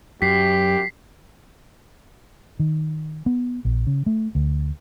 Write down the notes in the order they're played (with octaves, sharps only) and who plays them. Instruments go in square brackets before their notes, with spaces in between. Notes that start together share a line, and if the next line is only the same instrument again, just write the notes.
[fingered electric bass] F#2 [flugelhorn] G4 [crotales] B6 C7
[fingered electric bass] D#3
B3
A#1
C#3
A3
D2